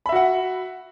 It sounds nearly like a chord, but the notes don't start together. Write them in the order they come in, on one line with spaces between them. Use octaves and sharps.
B5 E5 F#4 F#5